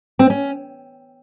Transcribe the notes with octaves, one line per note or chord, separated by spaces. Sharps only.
C4
C#4